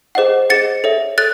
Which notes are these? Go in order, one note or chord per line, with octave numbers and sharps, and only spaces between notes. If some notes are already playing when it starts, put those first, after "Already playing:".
G#4 C5 D#5 F#5
G#4 C5 D#5 F#5 A6 C#7
A4 C#5 E5
A4 C#5 F#6 A6